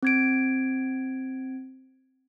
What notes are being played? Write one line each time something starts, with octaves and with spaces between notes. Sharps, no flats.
C4 G#6 D7